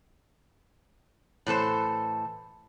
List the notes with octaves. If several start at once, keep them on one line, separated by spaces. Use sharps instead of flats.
A2 E3 A4 C5